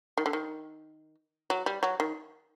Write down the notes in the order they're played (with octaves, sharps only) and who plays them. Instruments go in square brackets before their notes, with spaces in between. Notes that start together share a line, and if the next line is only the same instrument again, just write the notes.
[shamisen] D#3
D3
D#3
F#3
G3
F#3
D#3